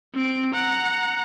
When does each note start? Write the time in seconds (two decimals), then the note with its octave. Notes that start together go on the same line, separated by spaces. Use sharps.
0.14 C4 D7
0.54 F#5 A#5